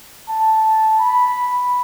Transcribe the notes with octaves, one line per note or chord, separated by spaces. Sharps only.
A5
B5